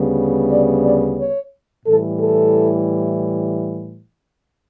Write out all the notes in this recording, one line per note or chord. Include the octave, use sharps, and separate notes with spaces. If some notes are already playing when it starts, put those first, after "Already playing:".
Already playing: D2 C#3 G3 B3
D5
D5
C#5
A2 E3 G3 A4
A4